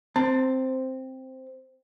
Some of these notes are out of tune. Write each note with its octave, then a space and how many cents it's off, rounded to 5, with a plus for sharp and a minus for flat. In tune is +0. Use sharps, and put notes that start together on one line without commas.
C4 +0 A5 +25